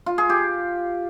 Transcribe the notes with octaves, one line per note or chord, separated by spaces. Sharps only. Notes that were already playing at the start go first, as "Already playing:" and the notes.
F4
G#4
G4